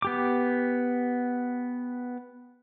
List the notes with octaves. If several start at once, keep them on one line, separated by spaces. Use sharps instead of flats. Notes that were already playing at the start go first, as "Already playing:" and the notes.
B3 G4 D6